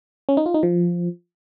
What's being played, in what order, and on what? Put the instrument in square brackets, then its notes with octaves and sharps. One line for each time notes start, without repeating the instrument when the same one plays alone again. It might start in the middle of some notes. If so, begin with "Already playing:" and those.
[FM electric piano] C#4
D#4
F4
D#4
F3